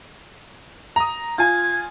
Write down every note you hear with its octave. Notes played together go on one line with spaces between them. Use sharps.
A#5 D#6
F4 G#5 G#6